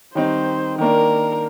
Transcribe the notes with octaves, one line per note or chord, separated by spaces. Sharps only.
D#3 G3 C4 D#4 C5
D#3 A#3 D4 A#4